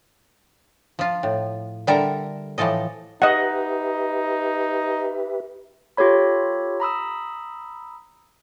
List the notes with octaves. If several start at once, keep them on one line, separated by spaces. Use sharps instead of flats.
F3 F4
A2
D3 G3 A4 A#4 E5 A#5
A2 E3 F3 A4 D#5
D#4 G4 B4 D#5 E5 F#5
F4 G4 A4 C#5 B5
A#5 B5 D#6 E6